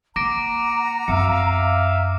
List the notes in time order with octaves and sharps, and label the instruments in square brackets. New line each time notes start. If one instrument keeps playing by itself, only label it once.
[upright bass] A#3 [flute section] F#5 A#5 [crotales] D6 A#6 D7
[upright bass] F#2 C4 [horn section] E5 F5 [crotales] C#7